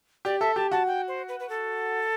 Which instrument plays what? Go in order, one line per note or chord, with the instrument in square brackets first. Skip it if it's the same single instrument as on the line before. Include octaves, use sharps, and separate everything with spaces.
[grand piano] G4 [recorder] D5
[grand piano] A4 [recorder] E5
[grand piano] G4 [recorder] A5
[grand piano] F#4 [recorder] A5
[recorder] G5
C5
B4
B4
A4